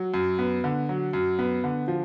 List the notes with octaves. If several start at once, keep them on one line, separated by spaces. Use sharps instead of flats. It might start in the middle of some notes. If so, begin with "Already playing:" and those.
Already playing: F#3
F#2
B3
D3
F#3
F#2
B3
D3
F3